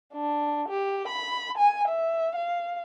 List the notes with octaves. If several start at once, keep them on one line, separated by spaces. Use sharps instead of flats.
D4
G4
B5
G#5
E5
F5